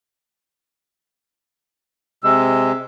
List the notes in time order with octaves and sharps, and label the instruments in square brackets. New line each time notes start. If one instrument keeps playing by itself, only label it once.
[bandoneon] C3 G#3 [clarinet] E6